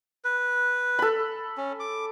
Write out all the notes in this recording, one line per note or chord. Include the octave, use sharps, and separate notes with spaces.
B4
A4 B5
C#4
D6